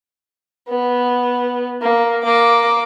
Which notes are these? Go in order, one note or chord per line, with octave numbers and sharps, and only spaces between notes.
B3
A#3
A#3 D6